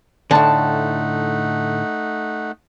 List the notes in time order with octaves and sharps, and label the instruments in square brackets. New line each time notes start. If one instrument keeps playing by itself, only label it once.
[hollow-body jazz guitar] A2 D3 [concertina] A3 D#4 F#5 [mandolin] A5